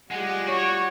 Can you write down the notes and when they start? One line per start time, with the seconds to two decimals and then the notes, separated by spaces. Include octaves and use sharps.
0.11 G3 G#3 F4 G4 G#4 F#5
0.48 F#4 C#5